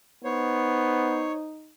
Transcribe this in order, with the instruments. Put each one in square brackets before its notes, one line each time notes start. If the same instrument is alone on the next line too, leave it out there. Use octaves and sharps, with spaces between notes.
[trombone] B3 [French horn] D#4 [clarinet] C5 [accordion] C#5